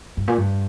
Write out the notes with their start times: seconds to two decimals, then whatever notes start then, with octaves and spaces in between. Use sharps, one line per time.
0.17 G2
0.28 A#2
0.38 G2